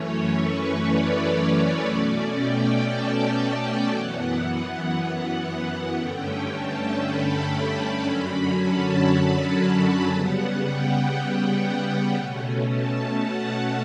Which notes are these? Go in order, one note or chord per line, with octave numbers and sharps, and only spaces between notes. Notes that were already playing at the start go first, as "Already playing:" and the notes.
Already playing: F#2 E3 A3 C#4 C#5
B4
D5
B2 A3 C#4
G5
A5
G5
F#2 E3 B3 F#5
F#5
G2 D3 A3 C#4 G5
A5
B5
F#2 D3 F#3 C#4
A5
B5
B5
C#3 G3 B3 F#5
G5
F#5
G5
B2 A3 C#4
A5
F#5